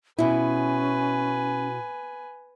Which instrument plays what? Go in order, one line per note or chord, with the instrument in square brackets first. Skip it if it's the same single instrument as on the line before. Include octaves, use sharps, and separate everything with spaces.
[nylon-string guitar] B2 E4 [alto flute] C#4 [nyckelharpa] B4 G#5